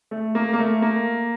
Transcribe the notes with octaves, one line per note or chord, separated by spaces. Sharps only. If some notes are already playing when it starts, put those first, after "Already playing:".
A3
A#3
A#3
A3
A#3